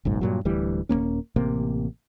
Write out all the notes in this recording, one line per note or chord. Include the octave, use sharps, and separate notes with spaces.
F#1 B1 G#2
G2 A#2 F#3
D1 D2 E3 G3
D#1 E2 A#3 C#4
A1 C3 A#3